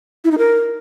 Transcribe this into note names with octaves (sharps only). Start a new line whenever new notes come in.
E4
D#4
A#4